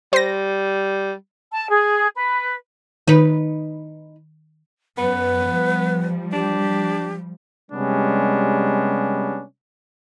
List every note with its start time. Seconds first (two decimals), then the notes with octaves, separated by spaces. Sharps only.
0.13 G3 C5 A#6
1.52 A5
1.70 G#4
2.16 B4
3.08 D#3 D#4 B4
4.98 F#2 B3 B4
5.48 F3 G3
6.33 D4 G4
7.72 C3 G3 G#3 B3 C#4 D4